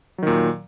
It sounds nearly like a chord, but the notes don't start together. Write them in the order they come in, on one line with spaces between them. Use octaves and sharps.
F#3 D#3 A#2